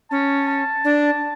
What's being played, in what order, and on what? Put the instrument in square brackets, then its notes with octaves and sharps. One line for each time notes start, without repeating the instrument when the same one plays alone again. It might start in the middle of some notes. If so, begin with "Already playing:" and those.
[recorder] C#4 [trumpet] A5
[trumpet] A5
[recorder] D4